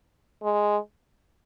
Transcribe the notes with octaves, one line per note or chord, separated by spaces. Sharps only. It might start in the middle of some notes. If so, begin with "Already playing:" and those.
G#3